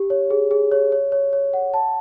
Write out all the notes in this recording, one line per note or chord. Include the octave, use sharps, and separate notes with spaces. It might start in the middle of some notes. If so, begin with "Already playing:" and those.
Already playing: G4
C#5
G#4
G#4
C#5
C#5
C#5
C#5
F#5
A5